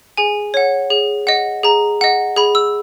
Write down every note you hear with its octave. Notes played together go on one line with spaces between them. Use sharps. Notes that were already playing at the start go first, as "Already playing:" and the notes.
G#4 G#5
C#5 F#5
G#4
D#5 F#5
G#4 A#5
D#5 F#5
G#4 B5
E6